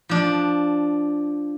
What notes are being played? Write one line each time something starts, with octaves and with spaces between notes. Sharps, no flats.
F3 D4